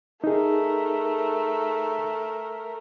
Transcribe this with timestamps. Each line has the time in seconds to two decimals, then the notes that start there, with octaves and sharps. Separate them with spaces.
0.24 A3 D#4 G#4 A#4